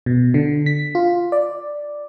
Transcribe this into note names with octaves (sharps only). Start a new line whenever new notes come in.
B2
D3
B6
F4
D5